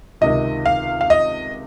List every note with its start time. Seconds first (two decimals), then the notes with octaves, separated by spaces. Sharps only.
0.21 C#2 C3 D#3 D#5
0.66 F5
1.01 F5
1.10 D#5